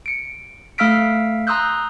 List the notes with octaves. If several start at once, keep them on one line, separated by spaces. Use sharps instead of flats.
C#7 D7
A3 F5 E6 F6 B6 D7
A#5 C6 D#6 E6 F#6 G6